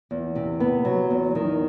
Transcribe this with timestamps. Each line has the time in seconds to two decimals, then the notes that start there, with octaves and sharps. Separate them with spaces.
0.11 E2
0.35 C3
0.60 B3
0.85 F#3
1.10 E2
1.35 D#3